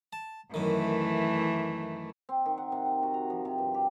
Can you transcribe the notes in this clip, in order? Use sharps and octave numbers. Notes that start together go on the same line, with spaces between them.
A5
F#2 D#3 E3 A3
C4
D#3
F#5
C3
F#5
F#4
A#5
F3
C3
G2
G4